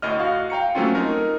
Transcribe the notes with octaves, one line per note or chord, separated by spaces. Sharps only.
D2 A2 D#5 F6
F#4 F5
F5 G5 A#5 C#7
F#3 A3 A#3 C4 C#4 F4
D#4 A#4